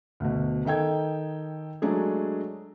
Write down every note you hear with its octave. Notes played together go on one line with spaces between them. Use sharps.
D2 B2
D#3 D#4 A4 G5 G#6
F#3 G#3 A3 D4 G#4